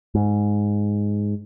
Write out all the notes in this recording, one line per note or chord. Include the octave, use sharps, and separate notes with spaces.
G#2